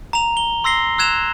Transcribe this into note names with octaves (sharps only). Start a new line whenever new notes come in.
A#5 F7
G7
C6 E6 A#6 C7 G7
E6 F#6 G#6 E7 F7